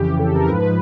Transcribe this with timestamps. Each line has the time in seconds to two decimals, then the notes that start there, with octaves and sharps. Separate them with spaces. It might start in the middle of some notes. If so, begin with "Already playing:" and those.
Already playing: F2 C#3 E3 G4
0.19 A4
0.35 A#4
0.49 G#2 F3 B4